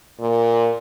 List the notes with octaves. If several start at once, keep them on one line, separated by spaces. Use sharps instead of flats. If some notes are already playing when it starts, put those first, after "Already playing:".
A#2